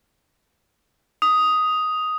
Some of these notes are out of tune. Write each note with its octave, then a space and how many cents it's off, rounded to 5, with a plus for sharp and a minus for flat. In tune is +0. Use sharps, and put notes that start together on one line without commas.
D#6 +5